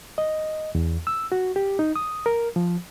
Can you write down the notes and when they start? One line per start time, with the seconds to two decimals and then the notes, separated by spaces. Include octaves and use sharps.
0.18 D#5
0.75 E2
1.07 E6
1.32 F#4
1.56 G4
1.79 D#4
1.96 D#6
2.26 A#4
2.56 F3